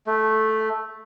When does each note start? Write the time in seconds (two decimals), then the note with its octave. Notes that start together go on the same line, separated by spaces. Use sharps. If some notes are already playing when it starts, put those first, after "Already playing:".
0.07 A3